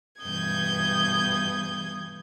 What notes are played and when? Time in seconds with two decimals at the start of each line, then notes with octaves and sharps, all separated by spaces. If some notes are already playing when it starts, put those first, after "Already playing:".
0.22 G2 B2 E3 D#6 G6 G#6